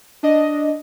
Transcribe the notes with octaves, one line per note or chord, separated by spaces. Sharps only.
D4 D#5